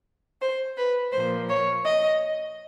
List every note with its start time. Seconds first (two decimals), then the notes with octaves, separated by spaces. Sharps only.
0.41 C5
0.77 B4
1.13 A#2 F3 A#3 C5
1.49 C#5
1.85 D#5